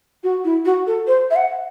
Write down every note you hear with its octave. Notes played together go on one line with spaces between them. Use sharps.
F#4
E4
F#4
A4
C5
E5
F#5